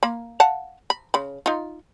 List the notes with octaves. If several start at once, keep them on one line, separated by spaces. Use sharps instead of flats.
A#3 B5
F5 F#5 A5
B5
C#3 B5
D#4 F4